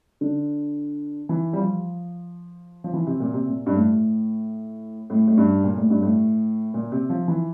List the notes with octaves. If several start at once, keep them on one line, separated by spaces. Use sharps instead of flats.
D3
E3
G3
F3
F3
E3
C3
A#2
C3
A#2
G2
A2
A2
A2
G2
A#2
A2
G2
A2
A#2
C3
F3
E3